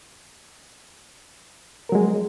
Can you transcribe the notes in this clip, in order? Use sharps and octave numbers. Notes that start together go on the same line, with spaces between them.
F#3 G#3 A#4